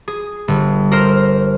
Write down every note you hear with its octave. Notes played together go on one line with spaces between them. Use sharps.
G#4
G1
A#4 C5 F6